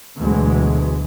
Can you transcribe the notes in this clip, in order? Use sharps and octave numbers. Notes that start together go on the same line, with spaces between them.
D2 B2 E3 F#3 G#3 B3